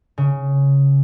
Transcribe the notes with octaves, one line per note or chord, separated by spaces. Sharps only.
C#3